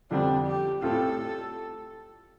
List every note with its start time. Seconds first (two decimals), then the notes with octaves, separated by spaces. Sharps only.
0.11 F2 D3 G3 C4 D4
0.47 G4
0.82 A2 A3 C4 F4 A4